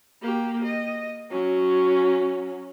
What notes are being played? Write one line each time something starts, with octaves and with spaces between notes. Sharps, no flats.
A#3 G4
D#5
F#3 C#4